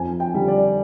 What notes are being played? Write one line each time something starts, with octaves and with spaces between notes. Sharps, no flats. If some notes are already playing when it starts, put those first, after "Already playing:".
Already playing: F2 G#5
G5
D3 G3
D5